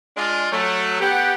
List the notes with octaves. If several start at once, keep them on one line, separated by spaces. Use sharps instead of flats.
G#3 D4 F4
F#3 A3
B3 G4 F#5